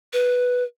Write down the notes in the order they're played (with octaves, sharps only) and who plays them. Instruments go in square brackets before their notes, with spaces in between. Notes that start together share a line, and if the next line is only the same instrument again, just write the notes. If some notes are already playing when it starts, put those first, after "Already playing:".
[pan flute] B4